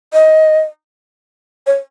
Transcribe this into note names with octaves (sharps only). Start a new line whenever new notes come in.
D#5
C#5